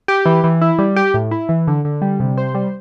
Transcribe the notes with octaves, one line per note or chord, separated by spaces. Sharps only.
G4
E3
E3
E4
G3
G4
A2
E4
E3
D3
D3
G3
C3
C5
G3